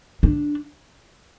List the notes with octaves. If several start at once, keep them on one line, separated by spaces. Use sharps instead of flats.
D4